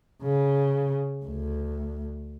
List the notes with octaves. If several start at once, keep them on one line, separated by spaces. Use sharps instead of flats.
C#3
D2